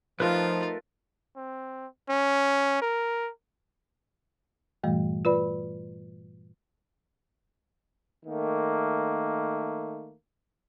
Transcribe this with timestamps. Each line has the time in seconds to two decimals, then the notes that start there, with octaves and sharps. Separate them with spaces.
0.20 F3 A3 D#4 F4 A#4 B4
1.37 C4
2.09 C#4
2.82 A#4
4.84 G2 A#2 E3 G3 A3
5.25 F4 B4 D5 B5
8.25 D#3 A3 A#3